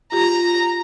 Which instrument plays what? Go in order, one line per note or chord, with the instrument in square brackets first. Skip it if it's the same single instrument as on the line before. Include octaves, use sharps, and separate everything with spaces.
[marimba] F4 G4 [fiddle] A#5